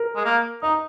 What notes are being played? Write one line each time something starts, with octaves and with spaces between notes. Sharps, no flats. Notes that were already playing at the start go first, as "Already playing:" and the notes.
Already playing: A#4
G#3
A#3
D#4 D#5